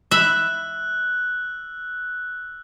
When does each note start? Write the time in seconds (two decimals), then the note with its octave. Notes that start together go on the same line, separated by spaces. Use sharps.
0.11 E5 B5 E6 F#6